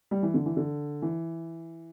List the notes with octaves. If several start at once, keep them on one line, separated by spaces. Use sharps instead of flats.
G3
E3
D3
E3
D3
E3